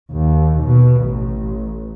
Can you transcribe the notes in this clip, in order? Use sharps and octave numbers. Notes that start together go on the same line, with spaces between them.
D#2
B2
A1